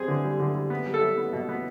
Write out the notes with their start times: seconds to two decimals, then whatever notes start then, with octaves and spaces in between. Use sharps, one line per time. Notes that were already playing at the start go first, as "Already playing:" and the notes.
Already playing: G3 C4 G#4
0.08 D3
0.24 G3
0.40 D3
0.55 G3
0.70 B3
0.86 G3
0.94 A4
1.01 G3
1.17 B3
1.33 B2
1.49 B3